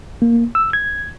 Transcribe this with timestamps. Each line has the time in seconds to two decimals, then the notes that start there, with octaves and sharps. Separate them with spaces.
0.22 A#3
0.55 E6
0.73 G#6